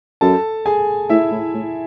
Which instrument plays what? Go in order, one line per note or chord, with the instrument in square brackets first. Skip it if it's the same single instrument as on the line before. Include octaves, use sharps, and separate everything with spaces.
[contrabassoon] F#2 [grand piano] A4 A5
[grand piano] G#4 G#5
[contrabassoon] A2 [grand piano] E4 E5
[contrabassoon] A2
A2